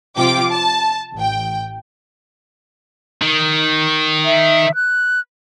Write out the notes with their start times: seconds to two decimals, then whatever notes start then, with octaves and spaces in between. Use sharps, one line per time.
0.17 C3 F3 F4 G5 D6
0.50 A5
1.15 A1 G5
3.22 D#3
4.25 E5
4.75 F#6